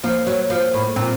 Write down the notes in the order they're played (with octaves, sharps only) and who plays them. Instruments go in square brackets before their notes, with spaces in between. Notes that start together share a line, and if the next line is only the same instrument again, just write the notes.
[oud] F3 [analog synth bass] A#3
[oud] F#3
F3
A2
[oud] A#2 [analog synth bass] C4